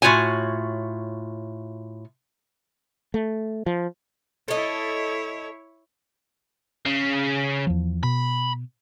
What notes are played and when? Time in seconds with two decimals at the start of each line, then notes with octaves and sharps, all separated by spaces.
0.02 A2 F4 F#4 C#5 G#5
3.14 A3
3.66 F3
4.48 E4 A4 C#5 D#5
6.86 C#3
7.67 E2 F3
8.03 B2 B5